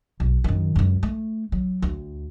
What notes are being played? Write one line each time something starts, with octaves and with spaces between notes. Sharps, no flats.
B1
F#2 D#3
C#2 F#2
A3
F#3
D2